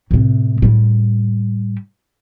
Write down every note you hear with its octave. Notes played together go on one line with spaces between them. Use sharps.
A2 C3
A2 G3